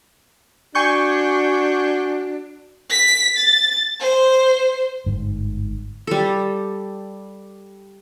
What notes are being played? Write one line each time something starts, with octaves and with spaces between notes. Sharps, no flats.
D4 F#4 G#5 C#6 G6
B6
A6
C5
G1 G#2
G3 A4